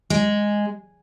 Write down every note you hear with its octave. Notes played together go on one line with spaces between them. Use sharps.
G#3